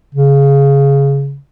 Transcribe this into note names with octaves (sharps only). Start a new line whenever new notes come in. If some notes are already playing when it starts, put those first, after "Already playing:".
C#3